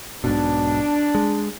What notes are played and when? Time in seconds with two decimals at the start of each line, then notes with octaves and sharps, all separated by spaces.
0.24 B1 G#2 B2 D4
1.15 G#3